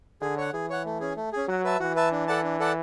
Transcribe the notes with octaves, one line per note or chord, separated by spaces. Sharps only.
D3 G#4
C#5 F#5
E3 G#4
C#5 F#5
A3
C#4 G#4
A3
C#4 G#4
F#3 F#4
B4 E5 A5
E3 F#4
B4 E5 A5
D4
A4 D5 F#5 A5
D4
A4 D5 F#5 A5